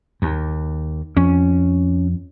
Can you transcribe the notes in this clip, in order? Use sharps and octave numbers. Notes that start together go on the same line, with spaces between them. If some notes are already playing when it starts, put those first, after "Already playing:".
D#2
F2 C#4